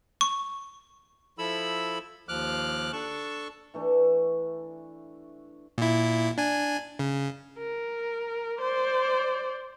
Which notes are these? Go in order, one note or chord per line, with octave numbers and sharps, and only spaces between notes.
C#6
F3 E4 A4 B5 E6
D#2 F3 D6 F6 F#6
D4 A4 A5 C#6
E3 A3 D4
A#2 E4
D4 G#5
C#3
A#4
C5 D5